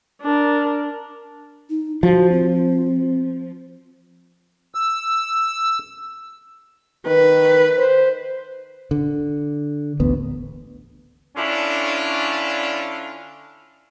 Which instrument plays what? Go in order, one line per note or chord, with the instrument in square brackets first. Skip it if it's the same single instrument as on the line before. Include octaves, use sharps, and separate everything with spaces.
[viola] D4 A#4
[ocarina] D#4
[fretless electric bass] F3 [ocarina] F#4
[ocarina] C4
[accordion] E6
[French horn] D#3 [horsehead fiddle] B4
[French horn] C5
[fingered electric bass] D3
A1 D2 B3
[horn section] D3 C#4 D4 E4 F4